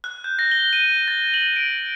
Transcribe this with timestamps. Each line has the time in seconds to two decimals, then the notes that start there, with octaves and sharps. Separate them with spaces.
0.04 F#6
0.24 G6
0.39 A#6
0.52 G7
0.73 D#7
1.08 A6
1.34 F#7
1.56 D7